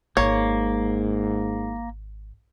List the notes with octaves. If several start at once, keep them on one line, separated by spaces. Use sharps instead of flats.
G#1 G#2 A#3 C#5